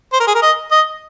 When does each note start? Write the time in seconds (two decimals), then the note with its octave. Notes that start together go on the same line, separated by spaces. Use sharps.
0.13 C5
0.20 A#4
0.27 G#4
0.35 A#4
0.42 D#5
0.71 D#5